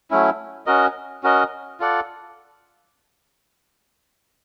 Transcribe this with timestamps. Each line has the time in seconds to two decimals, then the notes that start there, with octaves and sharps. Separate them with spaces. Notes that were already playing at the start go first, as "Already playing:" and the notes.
0.11 F#3 A3 C#4 E4
0.66 C#4 F#4 A#4 D#5
1.23 C#4 F#4 A#4 D#5
1.80 F4 A4 D5 F#5